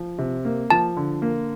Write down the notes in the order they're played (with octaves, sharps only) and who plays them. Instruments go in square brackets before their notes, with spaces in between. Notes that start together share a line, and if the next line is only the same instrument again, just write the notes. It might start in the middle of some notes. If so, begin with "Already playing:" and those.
Already playing: [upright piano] F3
C3
A#3
[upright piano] F3 [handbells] A5
[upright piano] D3
A#3